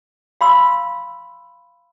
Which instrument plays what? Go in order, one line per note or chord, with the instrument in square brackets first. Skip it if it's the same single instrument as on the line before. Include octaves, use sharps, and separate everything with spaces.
[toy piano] F5 B5 C6 E6